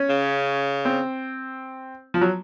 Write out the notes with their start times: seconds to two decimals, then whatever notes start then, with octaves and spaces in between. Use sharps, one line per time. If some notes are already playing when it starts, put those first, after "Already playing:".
Already playing: C#4
0.10 C#3
0.85 C4
2.14 F3
2.21 F#3